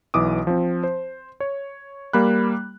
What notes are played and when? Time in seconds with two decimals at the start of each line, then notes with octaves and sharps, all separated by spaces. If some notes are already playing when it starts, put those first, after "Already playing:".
0.14 B1 E3 D6 D#6
0.47 F3 C4
0.84 C5
1.40 C#5
2.13 G3 A#3 B5 F#6